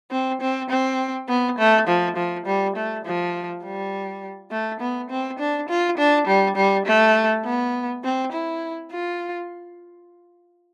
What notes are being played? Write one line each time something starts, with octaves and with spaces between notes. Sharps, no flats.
C4
C4
C4
B3
A3
F3
F3
G3
A3
F3
G3
A3
B3
C4
D4
F4
D4
G3
G3
A3
B3
C4
E4
F4